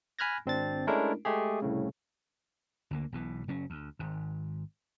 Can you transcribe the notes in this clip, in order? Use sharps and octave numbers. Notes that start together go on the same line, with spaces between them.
G#5 B5 F6 F#6 G#6 A#6
G#1 C4 D4 A6
G#3 A3 C#4 D4 E4 A#4
G#3 A3 G4 G#4
C2 A2 C#3
D2 D3 A#3
B1 B2 E3
F#1 F#3 C#4
D2
G#1 G#2